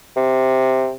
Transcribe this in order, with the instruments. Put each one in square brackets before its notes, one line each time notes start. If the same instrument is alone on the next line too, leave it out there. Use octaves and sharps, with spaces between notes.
[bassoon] C3